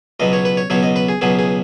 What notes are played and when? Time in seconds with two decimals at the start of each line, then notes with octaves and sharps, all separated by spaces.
0.20 C#2 B2 F#3 B3 D#5
0.33 C#5
0.45 B4
0.57 C#5
0.70 C#2 B2 F#3 B3 C#5
0.83 D#5
0.96 B4
1.09 G#4
1.21 C#2 B2 F#3 B3 G#4
1.39 G#4